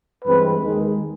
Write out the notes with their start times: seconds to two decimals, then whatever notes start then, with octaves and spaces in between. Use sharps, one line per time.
0.25 G2 E3 G#3 C4 B4
0.62 D#2 D#3 G#3